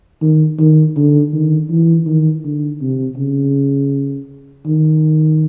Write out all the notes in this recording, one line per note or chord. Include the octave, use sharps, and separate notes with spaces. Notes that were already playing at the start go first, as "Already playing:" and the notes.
D#3
D#3
D3
D#3
E3
D#3
D3
C3
C#3
D#3